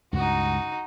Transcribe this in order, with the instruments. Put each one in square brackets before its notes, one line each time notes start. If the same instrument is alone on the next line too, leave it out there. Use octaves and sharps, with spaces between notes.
[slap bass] C#2 G2 [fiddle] D#4 F#4